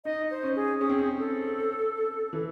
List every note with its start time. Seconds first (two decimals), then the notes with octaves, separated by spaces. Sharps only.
0.05 D#4 D#5
0.31 C5
0.43 C#4
0.56 G#4
0.81 C#4 G#4
0.89 C4
0.99 C#4
1.19 A4
2.33 E3